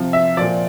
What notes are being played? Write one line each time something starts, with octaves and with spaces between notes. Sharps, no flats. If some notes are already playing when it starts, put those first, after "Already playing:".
Already playing: C3 F3
E5
A#2 F3 D5